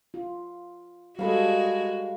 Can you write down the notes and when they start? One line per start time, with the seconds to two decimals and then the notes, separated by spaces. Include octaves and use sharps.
0.14 F4
1.19 G3 G#3 F#4 A4 F5 B5 D6